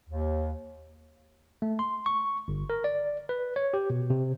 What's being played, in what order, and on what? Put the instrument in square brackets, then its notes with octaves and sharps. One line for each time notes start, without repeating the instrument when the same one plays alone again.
[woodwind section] D#2
[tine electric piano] A3
C6
C#6
G1
A#4
D5
B4
C#5
G4
B2
C3